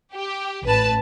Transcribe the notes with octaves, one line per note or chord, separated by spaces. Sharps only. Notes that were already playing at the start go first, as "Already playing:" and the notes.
G4
A1 B4 A5